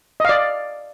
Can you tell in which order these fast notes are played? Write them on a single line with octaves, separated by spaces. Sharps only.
D#5 F5 D5